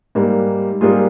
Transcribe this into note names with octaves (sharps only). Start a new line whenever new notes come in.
G#2 G3 A#3
G#2 G3 A#3 F4 G#4